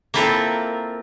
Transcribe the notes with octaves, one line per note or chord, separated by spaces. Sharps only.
A#3 C4 E4 F4 A4 A#4